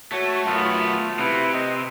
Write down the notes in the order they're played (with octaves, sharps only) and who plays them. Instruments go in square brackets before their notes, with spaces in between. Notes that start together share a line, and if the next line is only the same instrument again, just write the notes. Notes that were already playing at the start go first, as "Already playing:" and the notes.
[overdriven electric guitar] A3 [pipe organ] F#4 C#5
[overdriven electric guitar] F#2 B3 [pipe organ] A3 F4
[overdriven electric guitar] C3 [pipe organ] E4 B4
[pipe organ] C4 D#5